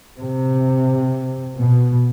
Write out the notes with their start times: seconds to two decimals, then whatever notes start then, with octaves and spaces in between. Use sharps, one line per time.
0.20 C3
1.56 B2